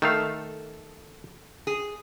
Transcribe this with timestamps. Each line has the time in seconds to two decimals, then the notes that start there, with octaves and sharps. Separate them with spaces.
0.02 D#3 A3 A4 F5
1.67 G#4